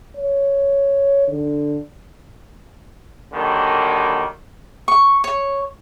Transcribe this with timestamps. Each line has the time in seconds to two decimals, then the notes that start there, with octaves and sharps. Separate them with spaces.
0.16 C#5
1.28 D3
3.33 D3 D#3 F#3 G3 A#3
4.88 C#6
5.24 C#5